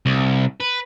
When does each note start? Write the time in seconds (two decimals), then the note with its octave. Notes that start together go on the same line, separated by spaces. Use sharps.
0.06 C2
0.61 B4